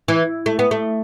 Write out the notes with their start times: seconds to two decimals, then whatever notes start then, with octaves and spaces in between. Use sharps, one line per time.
0.08 E3
0.46 A3
0.59 B3
0.71 A3